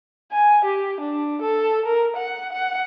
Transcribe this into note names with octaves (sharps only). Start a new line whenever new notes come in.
G#5
G4
D4
A4
A#4
F#5
F#5